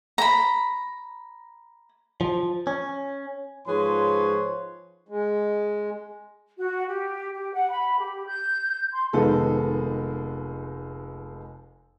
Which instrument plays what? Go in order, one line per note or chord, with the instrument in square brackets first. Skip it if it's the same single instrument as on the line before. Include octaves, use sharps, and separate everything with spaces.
[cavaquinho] A#5 B5
[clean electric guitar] F3
C#4
[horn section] G#2 F3 G#4 B4 C#5 C6
[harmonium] G#3
[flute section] F#4
G4
G4
F#5
B5
G4
G6
C6
[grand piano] F1 D#3 G#3 B3 A4 B4